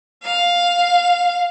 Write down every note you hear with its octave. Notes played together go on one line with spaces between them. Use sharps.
F5